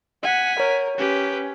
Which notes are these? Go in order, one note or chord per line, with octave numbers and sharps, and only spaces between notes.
F#5 G#5 B6
A#4 C#5
C#4 G4 B4